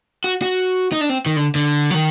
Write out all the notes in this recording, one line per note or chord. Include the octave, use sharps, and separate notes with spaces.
F#4
F#4
D#4
D4
C4
D#3
D3
D3
F#3
D#3